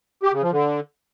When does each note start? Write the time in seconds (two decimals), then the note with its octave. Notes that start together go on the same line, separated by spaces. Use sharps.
0.23 G4
0.32 C#3
0.42 F3
0.52 D3